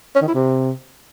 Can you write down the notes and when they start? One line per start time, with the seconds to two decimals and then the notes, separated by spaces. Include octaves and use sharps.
0.15 C#4
0.21 D#3
0.28 E4
0.34 C3